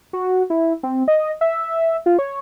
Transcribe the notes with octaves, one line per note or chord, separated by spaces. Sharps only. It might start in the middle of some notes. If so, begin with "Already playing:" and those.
F#4
E4
C4
D#5
E5
F4
C#5